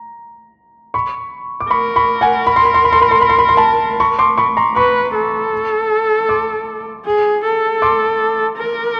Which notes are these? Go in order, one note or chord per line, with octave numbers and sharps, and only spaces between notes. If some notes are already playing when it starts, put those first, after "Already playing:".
Already playing: A#5
B5 C#6
D6
A#4 B5 C#6
B5 C#6
F#5 G#5
B5
C6
B5
C6
B5
C6
B5
C6
B5
C6
B5
C6
A5 B5
B5 C#6
C6 D6
B5 C#6
A#5 C6
B4 B5 C#6
A4
C6 D6
G#4
A4
C6 D6
A#4